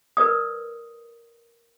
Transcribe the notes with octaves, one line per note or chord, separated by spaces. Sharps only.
A#4 B4 D5 D#6